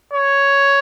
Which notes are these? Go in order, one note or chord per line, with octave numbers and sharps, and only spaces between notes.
C#5